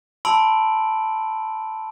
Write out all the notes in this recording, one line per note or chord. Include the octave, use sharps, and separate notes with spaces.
A5 B5 C6 E6 D7 F#7